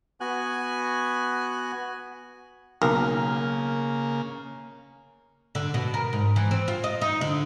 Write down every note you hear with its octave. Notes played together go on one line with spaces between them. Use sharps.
B3 F#4 G#5 F#6
B1 C#3 A#3 A#4
D3
B2
A#4
G#2
E3
C4
F4
D#5
D#4
D3